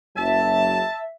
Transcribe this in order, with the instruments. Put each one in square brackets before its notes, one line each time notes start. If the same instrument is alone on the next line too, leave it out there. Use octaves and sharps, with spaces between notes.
[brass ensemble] F#1 F#3 [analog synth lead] E5 [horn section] A5